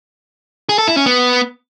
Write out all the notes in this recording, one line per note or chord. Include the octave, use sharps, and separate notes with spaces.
G#4
A4
E4
C#4
B3